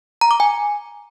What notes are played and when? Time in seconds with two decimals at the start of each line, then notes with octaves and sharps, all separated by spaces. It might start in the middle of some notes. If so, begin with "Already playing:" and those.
0.21 A#5
0.31 D6
0.40 G#5